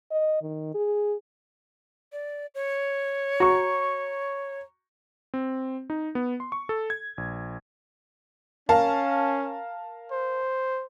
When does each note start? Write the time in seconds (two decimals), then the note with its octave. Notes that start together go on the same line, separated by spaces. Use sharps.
0.11 D#5
0.42 D#3
0.74 G#4
2.12 D5
2.55 C#5
3.40 F#4 A#5 C#6
5.34 C4
5.90 D#4
6.15 B3
6.40 C6
6.52 C#6
6.69 A4
6.90 G#6
7.18 A#1
8.69 C#4 A#4 F5 A5
10.12 C5